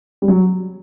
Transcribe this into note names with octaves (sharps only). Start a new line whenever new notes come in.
G3
F#3